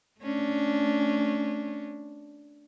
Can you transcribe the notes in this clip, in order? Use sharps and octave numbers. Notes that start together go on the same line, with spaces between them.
A3 C#4 D4